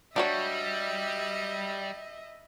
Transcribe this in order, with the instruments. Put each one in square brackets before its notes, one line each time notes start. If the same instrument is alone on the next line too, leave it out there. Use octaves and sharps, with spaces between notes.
[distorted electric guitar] G3 [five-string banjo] D4 F#4 C#5 [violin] D#5 E5